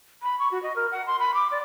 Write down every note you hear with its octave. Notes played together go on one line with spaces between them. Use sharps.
B5
C#6
F#4
D#5
A#4
F#5
C6
B5
D6
D5